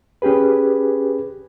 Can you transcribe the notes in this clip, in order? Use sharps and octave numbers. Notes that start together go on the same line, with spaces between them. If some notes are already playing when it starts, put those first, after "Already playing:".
C#4 G4 G#4 B4